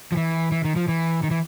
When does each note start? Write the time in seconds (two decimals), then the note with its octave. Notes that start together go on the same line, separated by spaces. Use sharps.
0.12 F3
0.17 E3
0.52 E3
0.64 D#3
0.76 F3
0.88 E3
1.23 D#3
1.31 E3